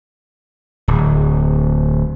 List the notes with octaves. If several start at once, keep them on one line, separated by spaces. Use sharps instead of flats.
D1